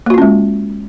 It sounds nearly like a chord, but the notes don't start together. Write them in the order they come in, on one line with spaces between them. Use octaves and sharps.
A#3 F#4 F4 C#4 G#3